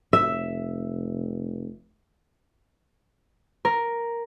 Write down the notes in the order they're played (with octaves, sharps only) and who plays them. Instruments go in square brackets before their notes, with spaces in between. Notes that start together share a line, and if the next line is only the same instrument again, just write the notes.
[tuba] F1 [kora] E5
[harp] A#4